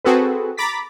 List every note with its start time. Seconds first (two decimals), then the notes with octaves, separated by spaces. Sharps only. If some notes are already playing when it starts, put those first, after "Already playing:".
0.05 C4 F#4 G#4 A4 B4
0.57 A#5 B5 D6 A6 B6